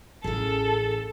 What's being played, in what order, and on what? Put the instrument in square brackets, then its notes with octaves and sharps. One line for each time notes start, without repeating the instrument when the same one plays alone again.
[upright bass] A1 [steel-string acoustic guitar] C#3 G#4 [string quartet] A4